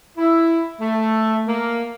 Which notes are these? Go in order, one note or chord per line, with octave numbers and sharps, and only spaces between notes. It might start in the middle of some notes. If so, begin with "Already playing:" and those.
E4
A3
A#3